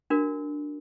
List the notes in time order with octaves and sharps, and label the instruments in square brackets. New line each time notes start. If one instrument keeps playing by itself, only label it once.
[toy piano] D4 F#4 A#4